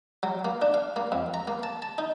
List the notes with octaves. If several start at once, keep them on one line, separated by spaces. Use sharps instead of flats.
F#3
A#3
D4
F5
A#3
F2
A#5
A#3
A5
A5
D#4